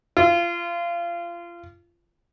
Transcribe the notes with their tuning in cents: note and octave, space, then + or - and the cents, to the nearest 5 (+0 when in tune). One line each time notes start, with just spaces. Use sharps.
F4 -25